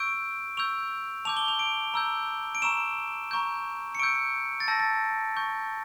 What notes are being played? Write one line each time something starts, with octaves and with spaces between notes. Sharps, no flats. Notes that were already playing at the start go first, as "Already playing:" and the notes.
Already playing: C#6 E6 G6 D7
C#6 E6 G6 F7
A5 D6 G6 F7
G7
F7
D7
A#5 E6 G6
D7
A#5 C#6 E6 E7
A#5 C#6 G6
C#7
C#6 E6 G6 D7
A6
A5 E6 G6 A#6
A6
C#6 G6